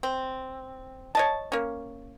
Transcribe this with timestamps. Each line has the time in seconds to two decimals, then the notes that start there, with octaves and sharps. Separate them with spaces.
0.03 C4
1.15 C#5 D#5 A5
1.52 A#3 C#4